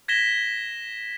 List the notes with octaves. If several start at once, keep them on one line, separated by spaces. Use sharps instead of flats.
G#6 A#6 B6 E7 G7